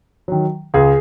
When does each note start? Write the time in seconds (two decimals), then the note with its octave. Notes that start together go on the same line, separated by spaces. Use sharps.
0.28 D#3 F#3
0.74 C#2 G#4